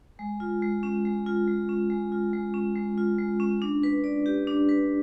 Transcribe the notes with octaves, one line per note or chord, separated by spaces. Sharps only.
G#3
F4
G#3
C#4
G#3
F4
G#3
C#4
G#3
F4
G#3
C#4
G#3
F4
G#3
C#4
D4
B4
D5
G4
D4
B4